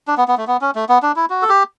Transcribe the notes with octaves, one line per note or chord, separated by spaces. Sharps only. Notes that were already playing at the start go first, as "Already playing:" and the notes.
D4
B3
B3
A3
B3
C#4
A3
B3
D4
E4
F#4
A4
G4